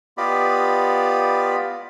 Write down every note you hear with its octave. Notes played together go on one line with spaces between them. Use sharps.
B3 F4 G4 D5 D#5 B5